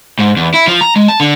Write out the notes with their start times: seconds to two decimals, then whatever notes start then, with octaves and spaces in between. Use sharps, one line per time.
0.19 G#2
0.36 E2
0.54 E4
0.68 F3
0.81 A#5
0.96 G#3
1.08 A5
1.20 D3